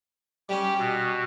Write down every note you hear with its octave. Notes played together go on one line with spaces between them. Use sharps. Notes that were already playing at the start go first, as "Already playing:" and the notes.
G3 C#4 G4
B2